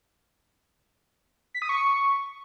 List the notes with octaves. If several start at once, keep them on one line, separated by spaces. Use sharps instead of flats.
B6
D#6
C#6